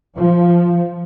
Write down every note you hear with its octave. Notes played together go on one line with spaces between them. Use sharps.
F3